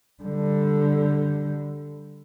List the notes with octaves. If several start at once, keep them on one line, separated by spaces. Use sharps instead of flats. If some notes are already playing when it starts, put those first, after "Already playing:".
D3 G3